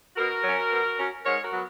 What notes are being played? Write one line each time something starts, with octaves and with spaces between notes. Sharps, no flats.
B2 F#4 A#4
F#3 C#4
B2
F#3 C#4
G#2 A#4 C#5
F#4 A#4
F#3 B3